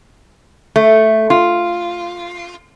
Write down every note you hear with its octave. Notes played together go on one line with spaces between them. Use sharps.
A3
F4